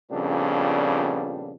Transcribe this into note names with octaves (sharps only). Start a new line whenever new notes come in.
F2 A#2 C#3 G3 B3 D4